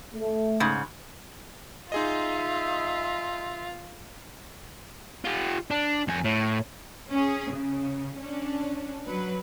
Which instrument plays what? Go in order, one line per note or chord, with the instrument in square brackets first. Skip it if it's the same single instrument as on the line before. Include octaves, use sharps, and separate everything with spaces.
[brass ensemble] A3
[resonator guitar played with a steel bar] G#2 C#3
[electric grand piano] D#4 G#4 D#5 [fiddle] F4 [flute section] E5 C6 E6
[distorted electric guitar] F4 G4
D4
F2 G#5
A2
[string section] C#4 G#4
C#3
C#4 D4
F#3 B4